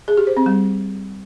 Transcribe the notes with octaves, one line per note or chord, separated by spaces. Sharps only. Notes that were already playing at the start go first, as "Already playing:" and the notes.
G#4
G4
C5
C4
G3